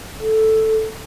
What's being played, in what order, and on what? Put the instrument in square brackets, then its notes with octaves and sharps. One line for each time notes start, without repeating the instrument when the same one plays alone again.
[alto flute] A4